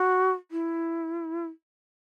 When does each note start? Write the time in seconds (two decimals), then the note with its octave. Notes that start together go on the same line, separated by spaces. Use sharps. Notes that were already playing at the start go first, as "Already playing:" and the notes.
Already playing: F#4
0.51 E4